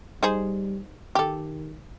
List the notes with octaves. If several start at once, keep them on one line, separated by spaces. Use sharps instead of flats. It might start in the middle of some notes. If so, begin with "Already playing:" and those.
G3 D#4 G#4 C5
D#3 G4 A4